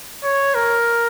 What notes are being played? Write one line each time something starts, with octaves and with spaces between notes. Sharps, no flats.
C#5
A#4